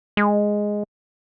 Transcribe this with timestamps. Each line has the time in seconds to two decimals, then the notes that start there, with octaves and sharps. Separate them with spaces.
0.17 G#3